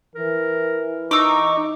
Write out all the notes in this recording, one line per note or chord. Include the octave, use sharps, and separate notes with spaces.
E3 A#4
D#4 C#6 D6 E6